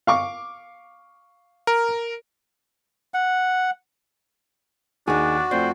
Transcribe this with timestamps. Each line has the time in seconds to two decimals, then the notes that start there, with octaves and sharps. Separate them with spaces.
0.07 F5 C#6 D6
1.67 A#4
3.14 F#5
5.07 D#2 D4 D#4 F#4 G#4
5.51 F2 A3 C4 C5 D5